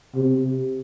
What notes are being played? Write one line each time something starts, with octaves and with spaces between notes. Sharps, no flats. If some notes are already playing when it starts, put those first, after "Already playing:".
C3